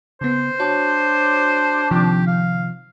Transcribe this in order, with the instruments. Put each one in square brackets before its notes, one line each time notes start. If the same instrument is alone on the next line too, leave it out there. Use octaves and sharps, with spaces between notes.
[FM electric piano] C#3 B3 [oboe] C5
[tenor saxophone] D4 [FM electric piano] F#4 C#5
[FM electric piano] C3 D#3 F3 [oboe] G4
[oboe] F5